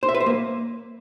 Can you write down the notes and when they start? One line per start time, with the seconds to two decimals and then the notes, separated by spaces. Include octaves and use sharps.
0.03 C5
0.09 E5
0.15 B4
0.20 C5
0.26 A#3